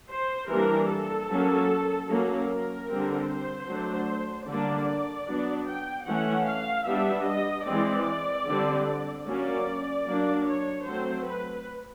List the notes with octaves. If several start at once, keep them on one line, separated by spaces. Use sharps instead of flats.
C5
E3 G3 A#3 D4 A#4
A4
F#3 A#3 C#4
F#3 A#3 C#4
A#4
D3 G3 C4
C5
F#3 A3 D4
D3 G3 A#3 D4 D5
F#3 B3 D4
G5
E3 A3 C#4 F#5
F5
G3 B3 D4 E5
D#5
E3 G#3 C4 D5
D3 G3 C4
F#3 A#3 C#4 D5
F#3 A#3 D4
C#5
F#3 A3 C4 C5
B4